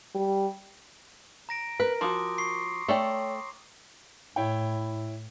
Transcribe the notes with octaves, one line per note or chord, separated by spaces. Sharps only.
G3
A#5 A#6 D7
A#4 B4
F3 F#4 C6 D6 D#6
C#6 C7
A3 C#5 D5 G5
A2 E4 C#5 G5